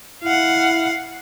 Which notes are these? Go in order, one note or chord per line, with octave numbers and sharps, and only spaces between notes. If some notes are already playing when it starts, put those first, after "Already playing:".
E4 F5 F#5